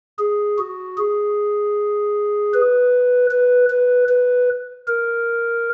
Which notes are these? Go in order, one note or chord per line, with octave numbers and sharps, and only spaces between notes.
G#4
F#4
G#4
B4
B4
B4
B4
A#4